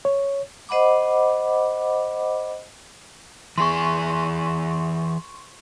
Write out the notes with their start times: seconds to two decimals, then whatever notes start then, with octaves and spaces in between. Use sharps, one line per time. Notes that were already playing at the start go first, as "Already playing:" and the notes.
0.05 C#5
0.69 C5 D#5 F#5 B5 D6
3.58 E3 G#4 C6 C#6